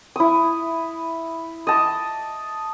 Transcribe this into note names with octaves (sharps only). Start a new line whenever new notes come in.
E4 D#6
D#5 A5 D6